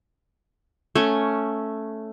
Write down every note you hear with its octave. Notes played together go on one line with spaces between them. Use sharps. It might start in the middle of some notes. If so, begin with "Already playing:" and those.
A3 C#4